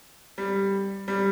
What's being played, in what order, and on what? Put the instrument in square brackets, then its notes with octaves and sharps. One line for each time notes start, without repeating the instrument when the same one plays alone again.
[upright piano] G3
G3